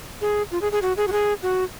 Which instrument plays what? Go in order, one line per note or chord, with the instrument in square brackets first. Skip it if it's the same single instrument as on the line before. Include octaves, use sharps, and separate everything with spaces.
[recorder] G#4
F4
G#4
G#4
F#4
G#4
F#4
G#4
F#4